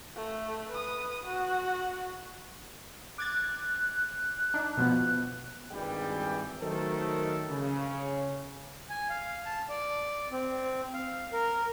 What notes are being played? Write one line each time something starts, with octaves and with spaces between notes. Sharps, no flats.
A3
B4 D#6
F#4 F#5
D6 F#6 G#6 A6
D4 D#4
B2 F3 B3
G#1 G2 E3 G3 G#4 G5
D#3 F#3 A3 A4 A#4 C5
C#3
G#5
F5
A5
D5
C4
F5
A#4